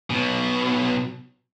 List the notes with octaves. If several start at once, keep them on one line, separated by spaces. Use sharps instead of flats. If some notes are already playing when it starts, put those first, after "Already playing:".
B1 B2